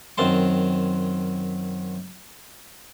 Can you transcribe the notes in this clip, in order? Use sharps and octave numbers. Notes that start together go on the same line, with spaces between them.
F#2 D#3 C4 A5 C6